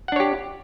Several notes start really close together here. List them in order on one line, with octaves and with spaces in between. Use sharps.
F#5 D4 C#5 G4